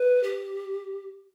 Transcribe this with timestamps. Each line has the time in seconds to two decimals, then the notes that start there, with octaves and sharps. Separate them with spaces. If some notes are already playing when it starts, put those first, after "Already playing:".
Already playing: B4
0.23 G4